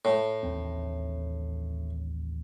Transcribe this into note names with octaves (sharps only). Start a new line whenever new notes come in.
A2
A1 D#2 C4